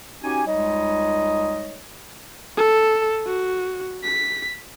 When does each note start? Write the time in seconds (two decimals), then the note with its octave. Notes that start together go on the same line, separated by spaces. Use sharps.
0.22 C#4 D#4 F#4 G4 G#5
0.46 C#2 G3 G#3 D#4 C#5 D#5
2.57 A4
3.26 F#4
4.04 B6